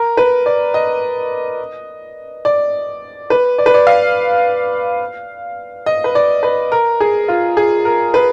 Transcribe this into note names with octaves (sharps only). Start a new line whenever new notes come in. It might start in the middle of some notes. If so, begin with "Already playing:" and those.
Already playing: A#4
B4
D5
D#5
D5
B4
D5
B4
D5
F5
D#5
B4
D5
B4
A#4
G#4
F4
G#4
A#4
B4